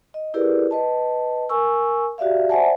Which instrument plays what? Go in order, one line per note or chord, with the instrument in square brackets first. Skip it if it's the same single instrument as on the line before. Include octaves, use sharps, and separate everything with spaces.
[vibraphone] D#5
E4 G4 G#4 A#4 B4 D5
B4 D#5 A5
A#4 G#5 C#6 E6
F#4 G4 D5 E5 F5
C5 D5 E5 F#5 G#5 A5